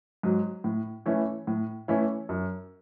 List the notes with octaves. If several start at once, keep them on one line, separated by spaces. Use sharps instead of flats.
G#2 F#3
A2
E3 A3 C#4 E4
A2
E3 A3 C#4 E4
F#2